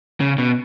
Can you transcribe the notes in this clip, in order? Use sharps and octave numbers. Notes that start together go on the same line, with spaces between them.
C#3
B2